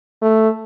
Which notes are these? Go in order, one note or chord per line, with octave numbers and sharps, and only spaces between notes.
A3